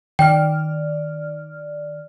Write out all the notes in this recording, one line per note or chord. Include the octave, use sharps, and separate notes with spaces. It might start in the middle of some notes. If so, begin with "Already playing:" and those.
D#3 D5 G5 F6